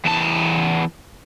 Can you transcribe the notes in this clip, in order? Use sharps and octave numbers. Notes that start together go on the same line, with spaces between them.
E2 A5